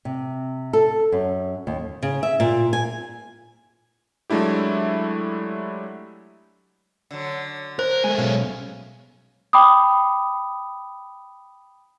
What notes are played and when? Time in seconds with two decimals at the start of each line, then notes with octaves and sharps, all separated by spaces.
0.05 C3
0.73 A4
1.12 F#2
1.67 D#2
2.03 C#3
2.23 E5
2.40 A#2
2.73 G#5
4.30 F#3 G#3 A3 D4 E4 G4
7.11 D3 F#3
7.79 A#4 C5
8.04 G#3 A3 G#5
8.18 B1 B2 C#4 F5
9.53 G5 B5 D6 D#6